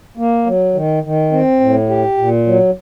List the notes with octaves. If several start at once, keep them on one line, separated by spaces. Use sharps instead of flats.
A#3
F#3
D#3
D#3
C4
A2
G4
A#2
F#3